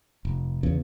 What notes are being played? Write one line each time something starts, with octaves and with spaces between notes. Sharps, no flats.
F1
E2 C#3